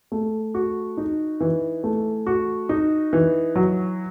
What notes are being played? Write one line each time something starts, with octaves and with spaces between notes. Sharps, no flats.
A3
F#4
D#4
E3
A3
F#4
D#4
E3
F#3